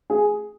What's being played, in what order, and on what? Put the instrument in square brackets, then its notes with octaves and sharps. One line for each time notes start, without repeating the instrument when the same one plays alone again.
[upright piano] G#4